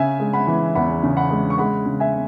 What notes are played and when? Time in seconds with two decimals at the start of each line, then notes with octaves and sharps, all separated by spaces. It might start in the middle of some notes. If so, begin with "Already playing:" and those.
Already playing: C#3 E5 G#5
0.20 G#3
0.33 F#5 B5
0.47 E3
0.75 E2 F#5 B5
1.03 C#3
1.17 F#5 B5
1.31 G#3
1.50 C#6
1.58 G#3 F#5 B5
1.86 C#3
2.00 E5 G#5